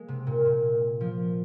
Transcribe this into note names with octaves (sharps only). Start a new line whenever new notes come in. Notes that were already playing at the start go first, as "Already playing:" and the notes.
Already playing: G#3 A#3
C3
A#2
A#2
F3